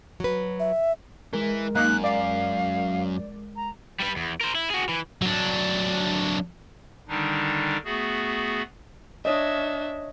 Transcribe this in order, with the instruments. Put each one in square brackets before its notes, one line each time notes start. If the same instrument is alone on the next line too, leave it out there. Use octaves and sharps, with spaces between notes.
[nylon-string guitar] F#3 B4
[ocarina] E5
[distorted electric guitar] E3 [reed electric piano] G#3 A#4
[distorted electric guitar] F#2 [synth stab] A#3 D#4 [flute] F#6
[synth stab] D5 [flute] F5
[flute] A#5
[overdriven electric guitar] G3 B4
E2
A#4 C5
E4
F#4 G#4
E3
[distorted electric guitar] F#3 D4
[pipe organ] D3 D#3 G3 D4 D#4
A3 B3 F#4 G#4
[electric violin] D4 E5 [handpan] C#5 D#5